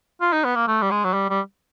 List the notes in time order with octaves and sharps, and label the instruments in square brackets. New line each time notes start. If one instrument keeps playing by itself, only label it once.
[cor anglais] F4
D#4
B3
A#3
A3
G3
G#3
F#3
G3
G3